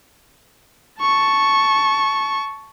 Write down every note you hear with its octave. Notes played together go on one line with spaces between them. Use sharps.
A5 C#6